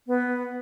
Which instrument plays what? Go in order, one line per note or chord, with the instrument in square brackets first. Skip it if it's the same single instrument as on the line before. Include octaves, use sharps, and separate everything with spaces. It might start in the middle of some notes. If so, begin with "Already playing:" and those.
[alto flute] B3